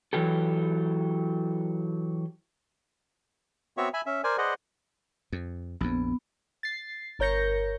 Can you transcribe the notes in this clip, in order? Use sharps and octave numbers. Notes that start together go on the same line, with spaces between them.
E3 F#3 G4 A4
B3 C4 F#4 C#5 E5 C#6
E5 G#5 B5
C#4 E5
A#4 C5 D5 G#5
G#4 B4 C5 D5 D#5 F#5
F2
A#1 F2 B3
A6 C7
G1 A#4 C#5 G6 A#6 C#7